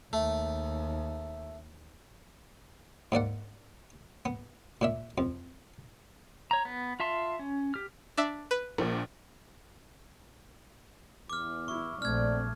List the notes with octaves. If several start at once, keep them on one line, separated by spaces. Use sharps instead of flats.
D#2 A3
G#2 A#3 D5 F#5
B3
A#2 D4 E5
F2
C#5 A#5
B3
F4 E5 A5 C6
C#4
G4 F6
D4 E5
B4
A#1 A#2
E2 D6 F6
E4 C#6
A#1 A3 C4 D5 F6 G#6